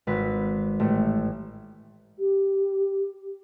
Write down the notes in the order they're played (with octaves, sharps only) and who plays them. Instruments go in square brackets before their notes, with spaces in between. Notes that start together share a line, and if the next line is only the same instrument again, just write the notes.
[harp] G#1 B4
A1 A3
[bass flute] G4